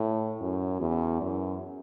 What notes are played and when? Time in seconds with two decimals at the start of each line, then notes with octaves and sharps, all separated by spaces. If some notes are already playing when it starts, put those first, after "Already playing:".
Already playing: A2
0.41 F#2
0.81 E2
1.21 F#2